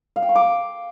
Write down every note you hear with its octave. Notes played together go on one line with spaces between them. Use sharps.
F5
G5
C#6
D6